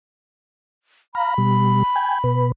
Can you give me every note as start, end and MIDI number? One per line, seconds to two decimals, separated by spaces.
1.15 1.34 77
1.15 1.34 82
1.15 2.47 83
1.38 1.83 47
1.38 1.83 55
1.96 2.19 79
1.96 2.19 80
2.24 2.52 47
2.24 2.52 71